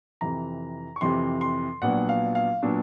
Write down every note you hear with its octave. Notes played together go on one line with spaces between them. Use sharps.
F2 C3 E3 A#5
C#6
F2 C3 E3 C6
C6
A#1 A#2 F#3 B3 D4 F#5
F5
F5
A#2 F#3 B3 D4